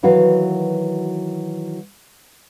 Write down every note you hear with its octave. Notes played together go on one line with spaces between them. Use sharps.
D#3 E3 F#3 F#4 B4 F5